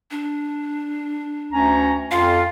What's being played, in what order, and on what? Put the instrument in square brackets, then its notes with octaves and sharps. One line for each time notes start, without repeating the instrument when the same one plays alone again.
[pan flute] D4
[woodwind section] D2 C#4 A#5
[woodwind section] F2 F4 [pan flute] F5